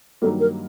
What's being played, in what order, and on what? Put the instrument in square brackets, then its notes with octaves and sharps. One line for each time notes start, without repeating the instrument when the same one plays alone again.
[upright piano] G2 D#3 F#3 A#3 [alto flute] A4
[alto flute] A#4